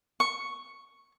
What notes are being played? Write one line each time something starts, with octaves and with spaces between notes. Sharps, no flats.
C#6